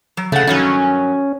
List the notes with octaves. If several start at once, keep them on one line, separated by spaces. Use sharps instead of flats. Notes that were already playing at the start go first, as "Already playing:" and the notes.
F#3
C#3 A3 F#5
G2 D#3 F#3 C#4